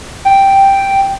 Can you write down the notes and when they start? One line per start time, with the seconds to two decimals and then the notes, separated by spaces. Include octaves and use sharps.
0.25 G5